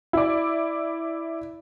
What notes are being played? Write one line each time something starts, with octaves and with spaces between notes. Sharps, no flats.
E4 D5